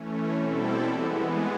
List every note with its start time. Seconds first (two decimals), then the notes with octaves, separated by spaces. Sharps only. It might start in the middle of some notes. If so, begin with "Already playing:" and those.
Already playing: E3 A3 C#4
0.33 B2 G3 C4 E4 A4
0.82 E3 G#3 B3